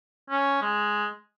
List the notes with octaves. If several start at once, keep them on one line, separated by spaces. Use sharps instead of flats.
C#4
G#3